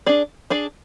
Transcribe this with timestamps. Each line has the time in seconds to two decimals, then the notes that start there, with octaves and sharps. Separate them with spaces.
0.06 D4 G#4 D5
0.50 D4 G#4 D5